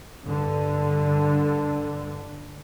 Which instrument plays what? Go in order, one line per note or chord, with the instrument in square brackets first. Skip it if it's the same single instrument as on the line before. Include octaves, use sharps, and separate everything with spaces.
[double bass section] G2 D3